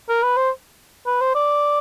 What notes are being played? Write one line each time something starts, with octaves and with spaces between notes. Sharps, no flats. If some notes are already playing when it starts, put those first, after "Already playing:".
A#4
B4
C5
B4
C5
D5